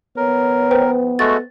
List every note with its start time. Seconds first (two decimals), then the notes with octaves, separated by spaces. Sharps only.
0.17 B3 A#4 C#5
0.71 B4 C5 G5
1.19 G#3 A3 F#4 A4 A6